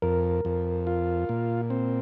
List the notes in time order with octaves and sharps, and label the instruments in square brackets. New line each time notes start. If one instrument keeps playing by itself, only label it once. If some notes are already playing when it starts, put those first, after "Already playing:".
[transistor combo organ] F2 [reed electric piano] A#4
[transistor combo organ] F2
F4
A#2
C4